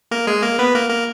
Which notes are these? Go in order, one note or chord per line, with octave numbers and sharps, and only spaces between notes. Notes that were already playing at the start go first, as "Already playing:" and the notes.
A#3 A#4
G#3 G#4
A#3 A#4
B3 B4
A#3 A#4
A#3 A#4